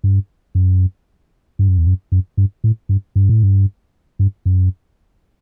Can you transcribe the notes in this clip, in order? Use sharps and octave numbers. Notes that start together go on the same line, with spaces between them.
G2
F#2
G2
F#2
E2
F#2
F#2
G2
A2
G2
G2
A2
G2
G2
F#2